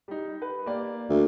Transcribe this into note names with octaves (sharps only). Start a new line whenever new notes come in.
G3 D#4
B4
A#3 G4 D5
D2